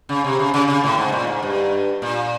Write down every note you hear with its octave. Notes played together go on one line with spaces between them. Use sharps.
C#3
C3
C#3
C#3
C#3
A2
G#2
A#2
G#2
G2
A#2